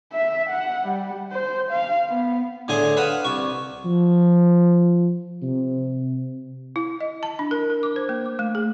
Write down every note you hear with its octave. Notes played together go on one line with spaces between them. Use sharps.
E5
F#5
G3
C5
F5
B3
A2 D3 G#4 G#5 C6
B4 F5 F#5 A5 D#6
C2 C#6
F3
C3
E4
D#5
A5
D4
A#4
A#4
D6
C5
A#3
D6
A3
G#4